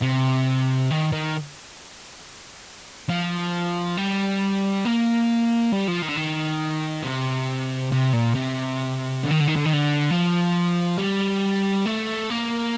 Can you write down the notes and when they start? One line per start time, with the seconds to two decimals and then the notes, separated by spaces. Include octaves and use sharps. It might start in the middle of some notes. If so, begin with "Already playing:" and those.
0.02 C3
0.91 D#3
1.12 D#3
3.09 F3
3.97 G3
4.85 A#3
5.72 G3
5.87 F3
6.02 D#3
6.09 D3
6.16 D#3
7.03 C3
7.92 C3
8.13 A#2
8.35 C3
9.23 D3
9.31 D#3
9.40 D3
9.48 D#3
9.56 D3
9.65 D#3
9.73 D3
10.11 F3
10.98 G3
11.86 A3
12.30 A#3